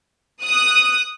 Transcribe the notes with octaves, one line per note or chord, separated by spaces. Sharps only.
D#6 F#6